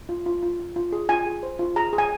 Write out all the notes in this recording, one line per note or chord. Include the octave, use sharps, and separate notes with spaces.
F4
F4
F4
F4
F4
G#4
F4 G#5
G#4
C5
F4
G#4 A#5
G#4
G#5